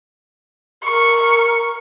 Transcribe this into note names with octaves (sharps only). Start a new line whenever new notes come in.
A#4 C#6